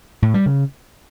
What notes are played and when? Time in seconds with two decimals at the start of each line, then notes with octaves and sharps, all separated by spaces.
0.22 A2
0.34 G3
0.46 C#3